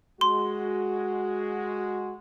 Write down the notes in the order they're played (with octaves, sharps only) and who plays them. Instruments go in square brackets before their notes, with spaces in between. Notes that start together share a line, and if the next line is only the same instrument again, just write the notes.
[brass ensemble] G#3 F#4 [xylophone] C6